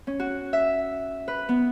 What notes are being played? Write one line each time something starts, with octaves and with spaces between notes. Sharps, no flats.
C#4
F#4
E5
B4
B3